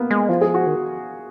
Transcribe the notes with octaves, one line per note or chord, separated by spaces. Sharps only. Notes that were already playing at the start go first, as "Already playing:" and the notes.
Already playing: A#3 B3
G#3
F3 F4
G#4
F#4
D#3